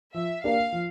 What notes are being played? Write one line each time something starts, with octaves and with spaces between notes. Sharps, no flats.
F3 E5
A#3 D4 G4 A#4 F5
F3